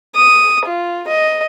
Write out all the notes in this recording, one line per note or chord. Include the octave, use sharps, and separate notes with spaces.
D#6
F4
D#5